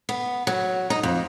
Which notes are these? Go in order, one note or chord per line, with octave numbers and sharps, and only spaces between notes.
B3
F#3
D#4
F2